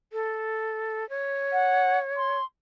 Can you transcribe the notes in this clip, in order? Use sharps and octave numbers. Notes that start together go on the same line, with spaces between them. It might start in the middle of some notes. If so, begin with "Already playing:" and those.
A4
C#5
F#5
C6